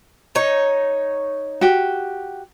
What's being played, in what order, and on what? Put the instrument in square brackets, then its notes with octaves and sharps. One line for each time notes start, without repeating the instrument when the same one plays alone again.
[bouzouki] D#4 C#5
[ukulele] F#4 G4